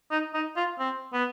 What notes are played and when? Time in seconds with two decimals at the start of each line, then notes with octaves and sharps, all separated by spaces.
0.11 D#4
0.34 D#4
0.57 F4
0.79 C4
1.13 B3